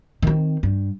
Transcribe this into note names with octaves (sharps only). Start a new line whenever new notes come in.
D#3 C4
G2